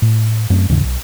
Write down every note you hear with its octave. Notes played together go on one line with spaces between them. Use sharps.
A2
F#2 A3 C4
D#2 G#2 C#3 E3
B1